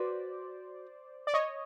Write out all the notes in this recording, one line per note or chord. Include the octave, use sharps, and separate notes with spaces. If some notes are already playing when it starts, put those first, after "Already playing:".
Already playing: F#4 B4 C5 D5
D5
C#5 D#5